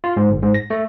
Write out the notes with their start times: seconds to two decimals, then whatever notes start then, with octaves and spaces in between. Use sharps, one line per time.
0.04 F4
0.17 G#2
0.30 G1
0.42 G#2
0.54 A#6
0.70 A3